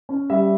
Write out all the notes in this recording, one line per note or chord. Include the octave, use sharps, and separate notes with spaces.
C#4
G3 E5